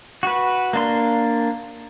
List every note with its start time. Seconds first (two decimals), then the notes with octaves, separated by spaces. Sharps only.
0.23 F#4 B4
0.73 A#3 D4 C6